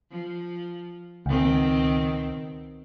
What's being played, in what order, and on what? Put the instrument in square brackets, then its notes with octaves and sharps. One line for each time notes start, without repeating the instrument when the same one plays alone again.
[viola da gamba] F3
[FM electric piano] C#2 [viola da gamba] B2 D#3 C4